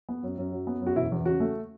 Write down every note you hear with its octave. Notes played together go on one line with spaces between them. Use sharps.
B3
F#2
F#2
F#3
B3
F#2
F#4
E1 E4
E2
C#3 F#4
A3